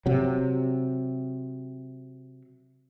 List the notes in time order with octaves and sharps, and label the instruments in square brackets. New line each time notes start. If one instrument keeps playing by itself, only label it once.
[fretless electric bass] C3 F#3